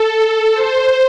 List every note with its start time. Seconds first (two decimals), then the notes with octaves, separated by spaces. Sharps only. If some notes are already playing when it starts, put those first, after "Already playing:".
Already playing: A4
0.54 C5